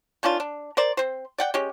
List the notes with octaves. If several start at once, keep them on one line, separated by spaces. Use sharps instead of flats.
D#3 C#4 D4 F4
D4
A#4 C5 D5
C4 C5
D5 F#5 G5
G#3 C#4 G4